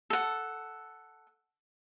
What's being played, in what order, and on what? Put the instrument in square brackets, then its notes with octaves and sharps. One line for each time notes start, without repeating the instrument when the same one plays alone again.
[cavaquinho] A4 F#5